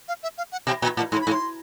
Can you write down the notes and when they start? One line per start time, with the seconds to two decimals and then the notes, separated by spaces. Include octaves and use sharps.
0.08 F5
0.23 E5
0.38 F5
0.52 F#5
0.67 B2 G5
0.82 A#2 G#5
0.97 A2 A5
1.12 G#2 C6
1.21 B5
1.27 G#2
1.32 C6